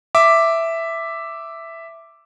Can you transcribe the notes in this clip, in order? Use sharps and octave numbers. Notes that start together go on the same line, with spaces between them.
E5 D6